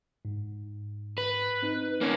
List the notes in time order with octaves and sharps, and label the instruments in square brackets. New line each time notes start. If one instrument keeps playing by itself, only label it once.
[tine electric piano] G#2
[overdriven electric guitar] B4
[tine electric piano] C4 D#4
[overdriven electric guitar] A#3 C#4